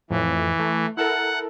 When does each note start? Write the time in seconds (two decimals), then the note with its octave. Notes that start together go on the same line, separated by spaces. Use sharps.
0.10 F2 A2 E3
0.59 A3
0.97 E4 A4 A#4 F#5